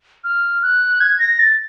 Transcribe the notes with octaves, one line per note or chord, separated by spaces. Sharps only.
F6
F#6
G#6
A#6
A6